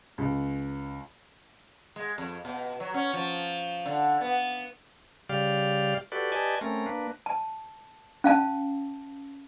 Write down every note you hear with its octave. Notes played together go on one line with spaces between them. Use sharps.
C#2
G#3
F2
B2
F#3
C#4
F3
D3
B3
C#3 G3 G4 D5 F5 F6
F#4 G4 A4 B4 D5
G4 B4 D5 D#5 G#5 A5
A3 C4 C#4 A#4
A#3 D4 B4
A5
C#4 F5 A5